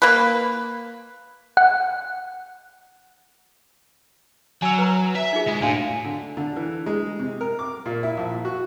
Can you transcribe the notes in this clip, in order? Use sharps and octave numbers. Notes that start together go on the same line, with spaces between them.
A#3 B4
F#5
F#3 G#5 E6
B4 A#5
E5
D#4 F4 G#4
G#3
A2 D4 F#4 F5
D3
D3
E3
G#3
C3
A#4
D6
A#2
E4
A#1
F#4